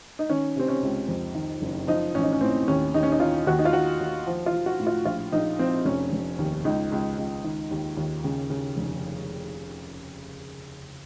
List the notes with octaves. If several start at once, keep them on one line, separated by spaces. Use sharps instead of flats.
D#4
D#3 C#4
C3 C4
C#4
C#2
F2
D#3
F#1
F3 D#4
A1 C#4
D#4
C#4
A2 C4
D#2 C#4
D#2 D#4
C#4
D#4
D#3 F4
D#2 F#4
D#4
F4
D#2 F#4
D#2
F3
F4
F3
F#4
A2
F4
A#1 F4
A#1 D#4
F3 C4
F1 C#4
F1
D#2
C#2 D#4
C#2
C#2
D#3
D#2
D#2
C#3
C#3
F1